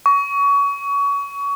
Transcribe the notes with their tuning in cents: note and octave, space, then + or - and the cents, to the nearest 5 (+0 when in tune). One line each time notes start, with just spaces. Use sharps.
C#6 +25